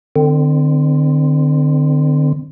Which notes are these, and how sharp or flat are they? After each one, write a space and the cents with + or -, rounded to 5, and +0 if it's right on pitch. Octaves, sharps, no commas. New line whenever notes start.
D3 +35 C4 -20